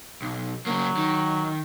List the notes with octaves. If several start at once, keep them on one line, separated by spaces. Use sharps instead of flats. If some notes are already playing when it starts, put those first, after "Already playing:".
B1
C#3 F#3 A#3
D#3